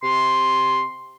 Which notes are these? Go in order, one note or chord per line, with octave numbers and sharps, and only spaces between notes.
C3 C6